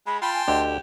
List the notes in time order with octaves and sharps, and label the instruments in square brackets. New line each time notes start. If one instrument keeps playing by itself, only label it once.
[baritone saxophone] G#3 [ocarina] B5
[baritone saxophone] F4 [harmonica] G5 A5 C6 [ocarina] B5
[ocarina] G#5
[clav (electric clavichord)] D2 D3 [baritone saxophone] G4 [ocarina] D#5